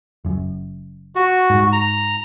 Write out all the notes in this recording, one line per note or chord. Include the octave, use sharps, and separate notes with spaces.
F#1 F#2
F#4
G#2
A#5